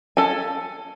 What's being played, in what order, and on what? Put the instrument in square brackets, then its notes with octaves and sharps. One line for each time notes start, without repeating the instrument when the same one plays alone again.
[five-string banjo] A4 G#5